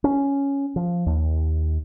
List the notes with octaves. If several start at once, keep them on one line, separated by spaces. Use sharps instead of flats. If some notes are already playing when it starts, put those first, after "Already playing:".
C#4
F3
D#2